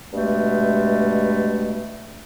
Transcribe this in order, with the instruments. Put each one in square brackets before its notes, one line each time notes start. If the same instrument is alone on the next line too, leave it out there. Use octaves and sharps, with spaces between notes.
[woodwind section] G2 B2 G#3 A3